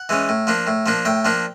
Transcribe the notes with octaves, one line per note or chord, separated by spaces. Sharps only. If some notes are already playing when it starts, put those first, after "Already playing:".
Already playing: F#5
E3 G#3 C#4
A2
F3 A#3 D4
A2
F3 A#3 D4
A2 G5
F3 A#3 D4